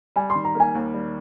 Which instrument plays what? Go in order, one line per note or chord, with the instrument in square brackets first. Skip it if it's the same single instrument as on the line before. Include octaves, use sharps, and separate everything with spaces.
[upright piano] G3 [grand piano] G#5
[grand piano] C6
[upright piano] D#3
[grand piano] A#5
[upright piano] A#3 [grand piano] G#5
[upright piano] D#2
G3